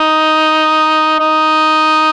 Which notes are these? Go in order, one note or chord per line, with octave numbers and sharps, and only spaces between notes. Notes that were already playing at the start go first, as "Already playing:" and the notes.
Already playing: D#4
D#4